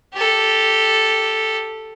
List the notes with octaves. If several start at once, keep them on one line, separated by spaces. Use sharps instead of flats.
G4 A4